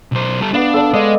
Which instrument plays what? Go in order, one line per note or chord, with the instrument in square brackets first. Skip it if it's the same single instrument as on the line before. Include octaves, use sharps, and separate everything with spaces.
[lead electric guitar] B1 C5
G3 A4
[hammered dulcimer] B3 F5 [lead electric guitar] D4
[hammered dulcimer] A4 D5 A5
[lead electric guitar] G#3 [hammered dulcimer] D#5